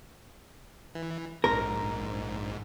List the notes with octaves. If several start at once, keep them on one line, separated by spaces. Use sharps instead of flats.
E3
A#1 G#2 A#4